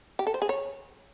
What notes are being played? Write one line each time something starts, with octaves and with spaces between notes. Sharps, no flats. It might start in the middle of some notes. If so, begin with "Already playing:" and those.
G4
A4
C5
G#4
C#5